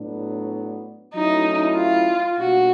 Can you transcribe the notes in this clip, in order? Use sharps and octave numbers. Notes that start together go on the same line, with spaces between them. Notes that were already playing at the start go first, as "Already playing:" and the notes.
Already playing: A2 F#3 B3 D4
F#3 A3 C#4 D#4 E4
F4
B2 G3 A#3 D4 F#4